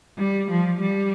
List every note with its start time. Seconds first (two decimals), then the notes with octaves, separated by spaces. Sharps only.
0.18 G3
0.49 F3
0.80 G3